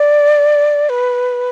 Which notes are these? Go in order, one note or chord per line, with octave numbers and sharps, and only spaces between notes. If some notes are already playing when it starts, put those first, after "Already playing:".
Already playing: D5
B4